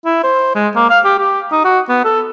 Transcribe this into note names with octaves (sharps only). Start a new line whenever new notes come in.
E4
C5
G#3
A#3
F5
G4
G4
D#4
F#4
B3
A4